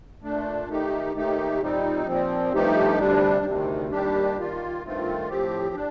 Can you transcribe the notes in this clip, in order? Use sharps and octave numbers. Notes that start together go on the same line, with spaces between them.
A#2 A3 D4
D#3 A3 D#4 G4
D#2 D#3 A3 D#4 G4
A#2 G3 C4 D#4
A#2 F3 C4
G2 F3 A3 D#4 G4
D2 C3 G3 D4
D2 C3 D#3
D#2 D#3 G3 D4 G4
D#3 A#3 F4
G2 D#3 A3 C4 F4
A2 F3 C4 G4
D4